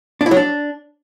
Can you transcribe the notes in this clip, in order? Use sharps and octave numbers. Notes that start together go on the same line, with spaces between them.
D4
E4
F#3
D4